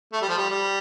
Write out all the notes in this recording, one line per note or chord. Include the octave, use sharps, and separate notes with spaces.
A3
G3
F3
G3
G3